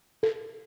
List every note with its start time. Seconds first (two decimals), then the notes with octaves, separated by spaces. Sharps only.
0.23 A4